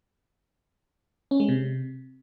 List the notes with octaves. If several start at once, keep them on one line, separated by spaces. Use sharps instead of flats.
C#4
G#3
C3